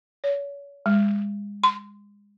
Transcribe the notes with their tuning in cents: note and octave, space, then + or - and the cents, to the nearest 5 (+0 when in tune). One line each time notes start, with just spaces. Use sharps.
C#5 +35
G#3 -30
C6 -20